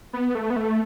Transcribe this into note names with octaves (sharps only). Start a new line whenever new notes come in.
B3
A3
B3
A3